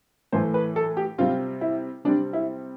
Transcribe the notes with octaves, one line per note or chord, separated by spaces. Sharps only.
A2 E3 A3 C5
B4
A4
G4
C3 G3 C4 F4
E4
C3 G3 C4 D4
E4